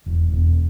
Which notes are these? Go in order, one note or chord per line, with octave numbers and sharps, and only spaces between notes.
E1
E1